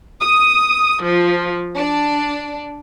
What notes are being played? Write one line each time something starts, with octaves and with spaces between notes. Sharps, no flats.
D#6
F3
D4